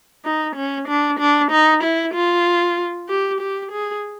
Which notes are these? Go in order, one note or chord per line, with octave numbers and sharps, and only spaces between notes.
D#4
C#4
D4
D4
D#4
E4
F4
G4
G4
G#4